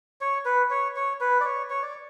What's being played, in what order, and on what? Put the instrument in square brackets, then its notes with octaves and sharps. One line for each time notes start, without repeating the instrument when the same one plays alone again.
[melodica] C#5
B4
C#5
C#5
B4
D5
C#5
C#5
D5